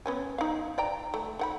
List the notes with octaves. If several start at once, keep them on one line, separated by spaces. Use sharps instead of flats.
B3 C#4 G#5
D#4 F5
D5 G5 A#5
A3
D#3 F#5 B5